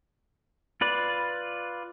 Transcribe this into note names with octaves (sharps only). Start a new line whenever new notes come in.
F4 B4 D5